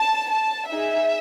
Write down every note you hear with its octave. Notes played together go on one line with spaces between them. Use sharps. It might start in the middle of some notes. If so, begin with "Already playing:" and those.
Already playing: A5
A5
D#4 G#4 E5